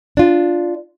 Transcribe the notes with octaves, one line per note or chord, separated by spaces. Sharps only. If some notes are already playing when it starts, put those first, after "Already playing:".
D4 F4